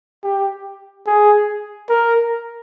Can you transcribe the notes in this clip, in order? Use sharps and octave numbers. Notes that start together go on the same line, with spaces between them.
G4
G#4
A#4